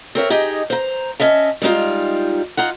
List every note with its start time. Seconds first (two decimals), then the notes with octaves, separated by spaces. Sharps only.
0.15 C4 A#4 C#5 E5
0.30 D#4 G4 G#4 D#5
0.70 C5 A#5
1.20 C#4 D#5 E5 A5
1.62 G3 G#3 D4 D#4 F4
2.57 D#4 F4 F#5